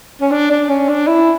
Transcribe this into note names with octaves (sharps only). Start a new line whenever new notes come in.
C#4
D4
D4
C#4
D4
E4